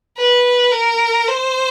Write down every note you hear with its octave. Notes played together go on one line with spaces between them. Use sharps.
B4
A#4
C5